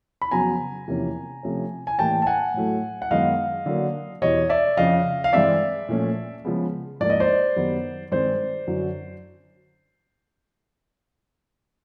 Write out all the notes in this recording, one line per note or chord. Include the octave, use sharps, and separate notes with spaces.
B5
F2 C#3 F#3 B3 G#5 A#5
E2 C3 F3 A#3 C#4
C3 F3 A3 C#4
G#5
A2 E3 G3 A#3 G5 A5
A5
F#5 G#5
A2 F#3 A3
F#5
F#2 D#3 G#3 B3 D#5 F5
D3 F#3 A#3
E2 B2 G3 C#5 D#5
D5 E5
F2 C#3 F3 D#5 F5
F5
G2 E3 G#3 C4 D5 E5
A#2 F3 A3 C#4
C#3 F3 G#3 B3
G#2 F3 A#3 D5
D#5
C5 D5
F#2 D#3 G3 B3
G2 D#3 G#3 C4 C5 D5
F#2 D3 F#3